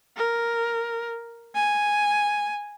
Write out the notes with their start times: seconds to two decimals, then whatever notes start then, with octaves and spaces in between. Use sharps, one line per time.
0.17 A#4
1.55 G#5